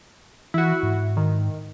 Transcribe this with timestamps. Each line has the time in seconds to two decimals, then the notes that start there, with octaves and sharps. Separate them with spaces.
0.54 E3 E4 F#4
0.83 G#2
1.17 D#3